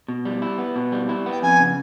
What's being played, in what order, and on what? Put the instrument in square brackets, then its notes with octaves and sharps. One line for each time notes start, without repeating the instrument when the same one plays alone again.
[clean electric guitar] B2
G3
E4
B3
B2
G3
E4
B3
[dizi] G5
[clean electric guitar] F2 [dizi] G#5
[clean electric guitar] C#3